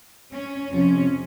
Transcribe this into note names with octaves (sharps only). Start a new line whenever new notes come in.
C#4
F2 C3 F3 C#4